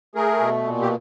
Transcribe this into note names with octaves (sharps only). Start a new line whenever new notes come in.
A3 G#4 A#4
B2
A#2
G4